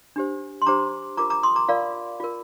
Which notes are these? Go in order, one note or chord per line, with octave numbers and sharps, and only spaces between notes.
D4 G4 C5
C6
D4 G4 C5 A#5 D6
F4 A#4 A#5 D6
A#5 D6
C6 D#6
A#5 D6
F4 A#4 D5 F5
F4 A#4